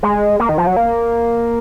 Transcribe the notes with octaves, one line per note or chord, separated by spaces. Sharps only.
G#3
A#3
D#3
F3
F#3
A#3